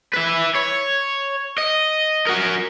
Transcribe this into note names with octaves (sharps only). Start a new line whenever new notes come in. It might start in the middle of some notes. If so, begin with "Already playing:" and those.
B4 E5
C#5
D#5
F#4 A#4